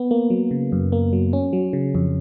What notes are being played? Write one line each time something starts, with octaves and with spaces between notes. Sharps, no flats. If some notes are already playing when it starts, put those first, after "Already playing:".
Already playing: B3
A#3
F#3
C#3
F#2
A#3
F#3
C#4
F#3
C#3
F2